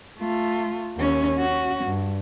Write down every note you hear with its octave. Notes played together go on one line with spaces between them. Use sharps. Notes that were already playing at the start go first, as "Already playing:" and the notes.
A3 F4
D#2 C#4
C#4 F#4
G2